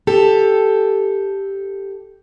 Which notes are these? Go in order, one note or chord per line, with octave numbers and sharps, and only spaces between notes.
G4 A4